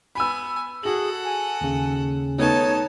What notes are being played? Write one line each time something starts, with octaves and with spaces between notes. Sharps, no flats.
B3 G#5 B5 E6
F#4 G#4 A4 F#5 F#7
G#5
D#2 C#3
D#3 A3 B3 D#4 C#5 A5